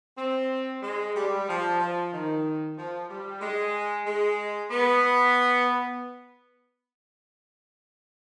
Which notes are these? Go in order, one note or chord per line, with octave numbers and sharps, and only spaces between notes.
C4
G#3
G3
F3
F3
D#3
F3
G3
G#3
G#3
B3